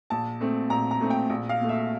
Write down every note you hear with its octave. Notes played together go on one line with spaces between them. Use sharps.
A#1 A5
A#2 A3 C4
A#1 A#5
A#5
A#2 A3 C4
G5
A#1
F5
A#2 A3
E5